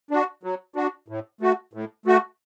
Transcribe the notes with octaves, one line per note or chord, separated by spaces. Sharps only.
D4 F#4
F#3
D4 F#4
A2
A3 F#4
A2
A3 F#4